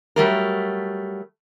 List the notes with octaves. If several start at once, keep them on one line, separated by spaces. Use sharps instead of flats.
F#3 G3 A3 A#4